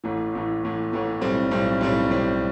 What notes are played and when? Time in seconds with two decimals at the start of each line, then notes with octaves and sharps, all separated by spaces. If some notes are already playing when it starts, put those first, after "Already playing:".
0.04 A1 A2 E3 A3
0.33 A1 A2 E3 A3
0.63 A1 A2 E3 A3
0.92 A1 A2 E3 A3
1.21 B1 A2 G3 C4
1.51 B1 A2 G3 C4
1.81 B1 A2 G3 C4
2.10 B1 A2 G3 C4